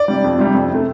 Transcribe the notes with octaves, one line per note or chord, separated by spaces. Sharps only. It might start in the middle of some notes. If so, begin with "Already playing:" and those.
Already playing: D5
C3 G3
F2
C3 G3
F2
C3 A3